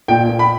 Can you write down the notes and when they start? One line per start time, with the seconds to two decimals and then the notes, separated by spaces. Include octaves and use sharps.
0.08 A#2 G5
0.29 A#2
0.39 B5